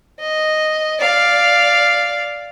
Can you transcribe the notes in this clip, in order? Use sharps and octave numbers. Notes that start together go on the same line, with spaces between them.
D#5
D5 F5